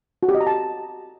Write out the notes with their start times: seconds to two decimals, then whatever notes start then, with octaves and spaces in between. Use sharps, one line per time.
0.23 F#4
0.29 G4
0.35 D#5
0.41 A#5
0.47 A5